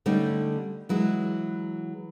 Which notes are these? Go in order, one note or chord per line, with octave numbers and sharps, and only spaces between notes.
D3 G3 A3 C#4 D#4
E3 F#3 G#3 E4